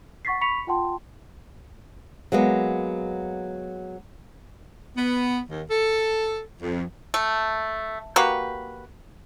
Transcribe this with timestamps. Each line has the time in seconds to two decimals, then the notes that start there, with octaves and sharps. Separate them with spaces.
0.25 F#5 C#6 A6 B6 C7
0.41 B5 C#6 B6 C#7 F7
0.67 F4 F#5 G5 A5 C6
2.32 F#3 G#3 A#3 B3
4.98 B3
5.50 D#2
5.71 A4
6.62 F2
7.14 A3
8.16 A#3 F#4 G4 B4